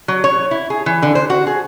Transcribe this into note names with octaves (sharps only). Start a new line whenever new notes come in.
F#3
C#5
E4
G#4
E3
D3
C5
F#4
G#4